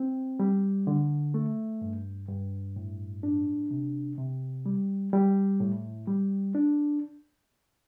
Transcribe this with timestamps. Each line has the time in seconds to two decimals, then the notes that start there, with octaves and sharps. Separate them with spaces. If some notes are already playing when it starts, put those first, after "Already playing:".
Already playing: C4
0.40 G3
0.87 D3
1.34 A3
1.81 G2
2.29 G2
2.76 A2
3.23 D4
3.71 C3
4.18 C3
4.66 G3
5.13 G3
5.60 A2
6.08 G3
6.55 D4